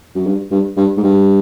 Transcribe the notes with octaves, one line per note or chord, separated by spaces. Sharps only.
F#2
G2
G2
G2
G#2
G2